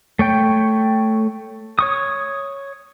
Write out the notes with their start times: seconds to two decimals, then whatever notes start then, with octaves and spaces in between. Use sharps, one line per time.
0.19 A3 C#5 G5
1.79 C#5 C#6 D#6